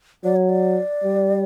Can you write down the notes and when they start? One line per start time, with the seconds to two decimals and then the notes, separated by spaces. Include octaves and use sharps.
0.24 F#3 D5
0.36 C#5
0.49 D5
1.04 G3